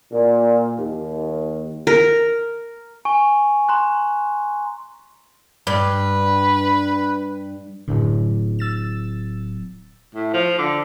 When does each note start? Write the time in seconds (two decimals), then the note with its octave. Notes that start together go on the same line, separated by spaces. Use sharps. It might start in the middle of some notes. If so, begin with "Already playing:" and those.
0.12 A#2
0.79 D#2
1.87 A#4
3.05 G#5 C#6
3.69 A#5 C6 F#6
5.67 G2 B4
7.88 D1 F#2 A2 D3
8.59 E6 A6 E7
10.15 A2
10.33 F3
10.59 D3